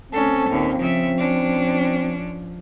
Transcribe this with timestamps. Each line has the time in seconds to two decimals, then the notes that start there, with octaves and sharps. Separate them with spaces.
0.12 D2 C4 C#4 A4
0.50 D#2 A#2 C#4
0.79 C#3 F3 E5
1.18 C#4 D4